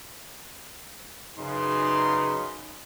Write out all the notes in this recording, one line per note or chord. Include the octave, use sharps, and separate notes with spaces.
F#2 C#3 D#4 B4 C6